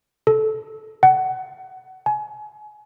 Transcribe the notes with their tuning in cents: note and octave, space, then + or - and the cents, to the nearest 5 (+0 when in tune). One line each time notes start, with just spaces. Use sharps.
A4 -15
F#5 +25
G#5 +30